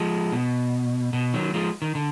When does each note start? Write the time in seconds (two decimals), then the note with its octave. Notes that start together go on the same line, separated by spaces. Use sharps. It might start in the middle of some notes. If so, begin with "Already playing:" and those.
Already playing: F3 G#3
0.32 B2
1.13 B2
1.34 D#3 F#3
1.54 F3 G#3
1.82 D#3
1.95 D3